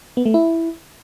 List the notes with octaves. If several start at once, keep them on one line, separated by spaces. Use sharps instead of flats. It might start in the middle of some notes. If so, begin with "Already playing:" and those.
B3
A3
E4